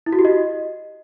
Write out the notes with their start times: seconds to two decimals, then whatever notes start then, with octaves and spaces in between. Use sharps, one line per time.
0.06 E4
0.13 F#4
0.19 G4
0.25 D#5